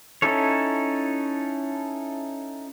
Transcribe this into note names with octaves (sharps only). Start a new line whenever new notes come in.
C#4 D#4 E4 A4 C#5